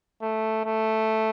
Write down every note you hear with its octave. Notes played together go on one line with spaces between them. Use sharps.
A3
A3